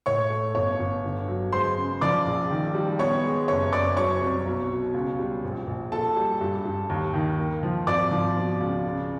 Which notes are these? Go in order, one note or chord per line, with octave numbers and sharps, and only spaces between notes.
A2 C#5 C#6
A3
G1 C#5 C#6
G1
D3
F#3
G#3 C5 C6
C#3
F3 D5 D6
A#1
D#3
G3
B3 C#5 C#6
G#3
F#1 C#5 C#6
F#1 D5 D6
F#3 C#5 C#6
C2
B1
B2
C#2
G3
A#1
A#1
A#2 A4 A5
G3
G2
G2
D#2
D#3
A#3
F3
G#1 D5 D6
F3
B2
C#2
C#3